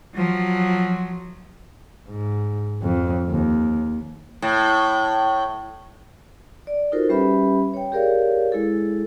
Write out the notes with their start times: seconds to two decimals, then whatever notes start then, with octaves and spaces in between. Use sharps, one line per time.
0.15 F3 F#3
2.09 G#2
2.82 F2
3.29 D#2
4.42 A2
6.67 D5
6.92 D#4 F4 F#4 A4 A#4 C5
7.09 G3 C#4 G4 B4 E5 B5
7.74 C#5 G5
7.92 G4 G#4 A#4 C#5 D5 F5
8.52 G#3 E4 G#4 A4